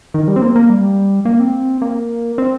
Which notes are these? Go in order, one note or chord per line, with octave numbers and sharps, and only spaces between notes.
D#3
G3
C4
A#3
A#3
G3
A#3
C4
A#3
C4